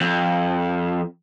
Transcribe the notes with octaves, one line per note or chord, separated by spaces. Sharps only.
F2